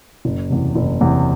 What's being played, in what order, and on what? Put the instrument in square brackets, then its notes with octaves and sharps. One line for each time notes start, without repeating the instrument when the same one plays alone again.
[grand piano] F#1
E2 C3
F#1
E2 C3